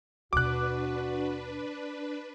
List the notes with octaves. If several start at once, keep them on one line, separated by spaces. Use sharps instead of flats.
D#2 B2 D4 F#4 B4 D6 F#6